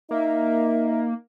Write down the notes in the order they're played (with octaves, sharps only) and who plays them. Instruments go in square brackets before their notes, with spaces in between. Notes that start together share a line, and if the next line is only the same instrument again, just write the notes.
[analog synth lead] A#3 [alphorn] D#4 [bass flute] E5